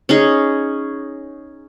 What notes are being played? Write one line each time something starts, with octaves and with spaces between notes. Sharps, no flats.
C#4 D#4 G#4